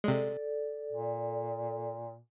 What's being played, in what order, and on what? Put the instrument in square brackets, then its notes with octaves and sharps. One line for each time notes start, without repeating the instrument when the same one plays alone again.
[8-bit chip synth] C3 G#3 [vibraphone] A4 D5
[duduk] A#2